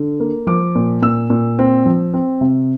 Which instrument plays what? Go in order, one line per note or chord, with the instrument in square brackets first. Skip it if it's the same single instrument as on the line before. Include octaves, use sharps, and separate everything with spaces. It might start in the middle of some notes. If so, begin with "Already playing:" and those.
Already playing: [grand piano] D3
A#3
F3 D6
A#2
A#2 E6
A#2
C4
F3
C4
C3